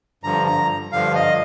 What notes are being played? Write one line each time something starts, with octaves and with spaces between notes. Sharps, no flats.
G2 D3 F3 A#5
A#5
G2 D3 F3 F5
D#5